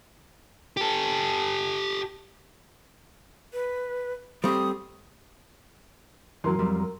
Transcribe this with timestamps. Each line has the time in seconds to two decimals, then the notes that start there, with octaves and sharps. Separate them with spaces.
0.77 G4 A4
3.53 B4
4.44 G3 A3 C4 D#6
6.44 F#2 E3 F#3 A#4 C6
6.59 F2 G3